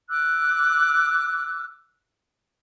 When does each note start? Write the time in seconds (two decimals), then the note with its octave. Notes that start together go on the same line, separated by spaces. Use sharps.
0.10 D6 E6 F#6